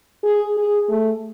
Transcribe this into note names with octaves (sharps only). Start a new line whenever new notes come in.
G#4
G#4
A3